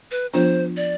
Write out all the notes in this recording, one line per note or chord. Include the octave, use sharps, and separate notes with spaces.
B4
F3 B3 D4 F4 C5
D5